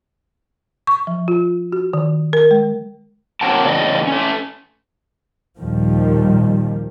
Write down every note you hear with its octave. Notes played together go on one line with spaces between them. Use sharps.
C#6
F3
F4
F#4
D#3
A#4
G#3
A#3 C4 C#4 F#4 A#4 A5
E2 A2 C#3 D5 D#5
A3 C#4
D#2 A#2 D#3 F3 G3